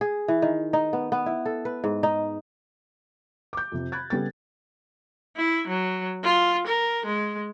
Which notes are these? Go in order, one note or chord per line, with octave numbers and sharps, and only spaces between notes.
G#4
E3
D#3
D#4
B3
B3
E4
A4
B4
G#2
D#4
D6 G6
F2 C3
B5 F#6 G#6 A6
C#3 G3 B3 A4 A6
E4
F#3
F4
A#4
G#3